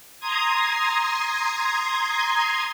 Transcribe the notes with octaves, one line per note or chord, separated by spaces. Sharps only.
A#5 C6 D#6 G#6